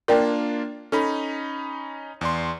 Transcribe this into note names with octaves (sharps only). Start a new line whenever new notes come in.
A#3 D4 F4 A#4 D5 G5
C#4 D#4 A4 B5
E2 D5 C6